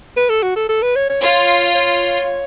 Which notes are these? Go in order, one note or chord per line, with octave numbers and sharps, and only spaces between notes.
B4
A4
F#4
A4
A4
B4
C#5
C#5
F4 C#5
C#5